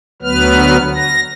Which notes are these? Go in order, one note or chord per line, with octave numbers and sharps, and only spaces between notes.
D2 F#3 B3 B4 F6
A#6